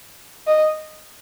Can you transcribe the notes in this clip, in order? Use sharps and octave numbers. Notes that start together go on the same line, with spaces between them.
D#5